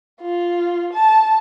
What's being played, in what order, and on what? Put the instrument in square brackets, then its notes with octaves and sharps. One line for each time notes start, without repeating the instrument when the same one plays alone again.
[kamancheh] F4
A5